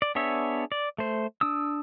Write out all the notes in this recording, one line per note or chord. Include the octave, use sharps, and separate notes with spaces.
D5
B3 D4 G#4 C#5 E5
D5
A3 C5
D4 D#6 E6